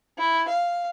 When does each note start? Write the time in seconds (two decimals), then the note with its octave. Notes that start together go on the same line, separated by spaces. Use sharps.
0.18 E4
0.48 F5